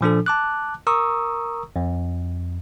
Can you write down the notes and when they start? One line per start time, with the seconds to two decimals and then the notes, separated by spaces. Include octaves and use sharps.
0.01 A#2 F3 D4 A4
0.26 A5 D6 F#6
0.87 A#4 A#5 C#6 D#6 E6
1.76 F2